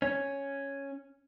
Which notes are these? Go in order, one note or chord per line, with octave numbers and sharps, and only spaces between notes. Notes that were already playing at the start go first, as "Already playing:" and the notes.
C#4